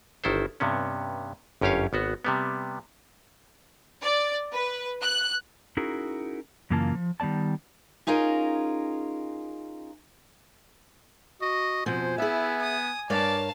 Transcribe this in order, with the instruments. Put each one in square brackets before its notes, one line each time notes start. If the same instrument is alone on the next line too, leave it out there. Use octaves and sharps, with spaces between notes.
[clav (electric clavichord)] G1 D#3 E4 A4 C5
G2 C3 B3 C#4
G1 F#2 C#4 G4 C#5 F5
G#1 B3 F#4
C3 G3 B3
[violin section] D5
B4
F#6
[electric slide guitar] C#4 D#4 E4 F#4 G#4 A#4
F#2 C#3 E3 A#3 F4 A5
F3
D#3 G3 B3 D5 A5
[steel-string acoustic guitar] C#4 D#4 F4 G#4 A#4
[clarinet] F#4 [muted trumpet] D#5
[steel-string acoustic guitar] F2 B2 F3 [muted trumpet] C5 [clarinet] G#5
[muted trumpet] B3 [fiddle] E4 [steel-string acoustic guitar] G#4 E5
[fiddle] D#6
[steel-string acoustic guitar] G2 A#4 C#5 [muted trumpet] D5 [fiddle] F5 A5